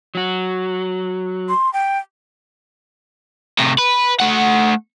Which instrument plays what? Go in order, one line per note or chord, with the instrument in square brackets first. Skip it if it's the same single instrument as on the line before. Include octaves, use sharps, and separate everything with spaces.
[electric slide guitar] F#3 F#4
[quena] C6
G5
[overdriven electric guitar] A2 C3
B4
A3 F#5